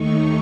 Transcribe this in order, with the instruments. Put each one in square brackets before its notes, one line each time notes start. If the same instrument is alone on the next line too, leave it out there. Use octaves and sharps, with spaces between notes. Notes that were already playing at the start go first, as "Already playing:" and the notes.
Already playing: [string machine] D#2 D#3 A3 D#4 C#6